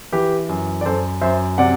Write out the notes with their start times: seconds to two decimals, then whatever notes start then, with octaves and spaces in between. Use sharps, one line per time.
0.12 E3 G4 B4
0.49 F#2
0.81 D5
0.86 F#2 A4 C5
1.21 F#2 C5 E5
1.58 C3 D5 F#5